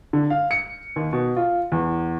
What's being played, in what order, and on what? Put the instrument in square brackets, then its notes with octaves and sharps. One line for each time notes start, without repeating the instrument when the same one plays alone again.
[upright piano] D3
F5
C#7
D#2
B2
F4
E2